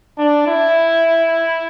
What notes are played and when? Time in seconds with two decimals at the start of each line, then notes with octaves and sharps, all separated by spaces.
0.18 D4
0.47 E4